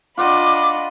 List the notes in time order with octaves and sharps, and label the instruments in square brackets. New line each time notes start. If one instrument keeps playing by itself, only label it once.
[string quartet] D4 D#5 B5 [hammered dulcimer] F4 F#4 D5 [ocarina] D6